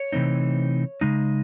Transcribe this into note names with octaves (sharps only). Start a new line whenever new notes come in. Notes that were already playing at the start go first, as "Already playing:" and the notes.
Already playing: C#5
C3 E3 A3 C4 D#4
C#3 G#3 D#4